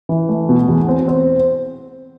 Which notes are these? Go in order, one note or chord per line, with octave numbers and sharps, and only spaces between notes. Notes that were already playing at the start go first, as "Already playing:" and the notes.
E3
A3
B2
E2
C4
C4